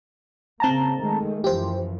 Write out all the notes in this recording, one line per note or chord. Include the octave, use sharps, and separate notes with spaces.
C#3 A#3 C4 A5 A#5
D#3 G#3 A3
F#2 E3 F3 G4 C5